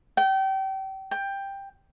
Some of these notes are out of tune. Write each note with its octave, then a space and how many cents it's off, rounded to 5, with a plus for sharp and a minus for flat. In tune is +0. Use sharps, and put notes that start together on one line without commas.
G5 -30
G5 +10